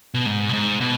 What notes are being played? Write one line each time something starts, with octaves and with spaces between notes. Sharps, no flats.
B2
G#2
B2
G#2
B2